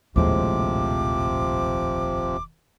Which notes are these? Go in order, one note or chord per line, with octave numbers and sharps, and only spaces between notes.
F1 A#1 D#2 A2 C3 F3 G#3 D6